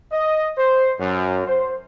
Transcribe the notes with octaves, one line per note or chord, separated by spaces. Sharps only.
D#5
C5
F#2
C5